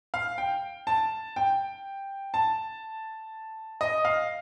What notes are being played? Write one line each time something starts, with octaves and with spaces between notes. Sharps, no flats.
F5
G5
A5
G5
A5
D#5
F5